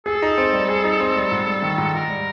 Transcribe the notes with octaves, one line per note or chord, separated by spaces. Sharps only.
G#4 A4
D#4
C4
G3
G#4
D#4
C4
G3
G#2
G3
D#3
G#2
G#2 A#4
G3